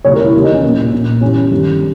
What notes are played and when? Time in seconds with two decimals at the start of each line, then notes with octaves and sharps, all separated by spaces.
0.04 E1 D#2 C#3 E3 C#5
0.14 A#4
0.23 E4
0.34 D#2 C#3 E3
0.44 D#4
0.53 C#4
0.63 B1 A#2 B3
0.92 A#1 A#2
1.21 G1 G2 E3 C#4
1.51 G1 G2 D#3